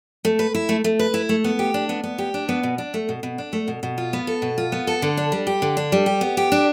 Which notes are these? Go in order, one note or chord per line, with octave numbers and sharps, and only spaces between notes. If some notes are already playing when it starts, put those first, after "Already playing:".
A3
B4
E4
A3
A3
B4
E4
A3
B3
G4
D4
B3
B3
G4
D4
B3
B2
D4
A3
B2
B2
D4
A3
B2
B2
F4
B3
A4
B2
F4
B3
A4
D3
D4
G3
G4
D3
D4
G3
G4
B3
G4
D4